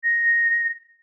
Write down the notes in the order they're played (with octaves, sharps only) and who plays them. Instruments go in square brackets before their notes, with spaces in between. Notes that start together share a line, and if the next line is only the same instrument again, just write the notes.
[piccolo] A#6